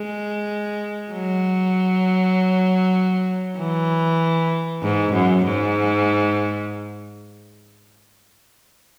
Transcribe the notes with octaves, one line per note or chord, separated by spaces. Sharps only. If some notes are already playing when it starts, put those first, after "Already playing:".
Already playing: G#3
F#3
E3
G#2
F#2
G#2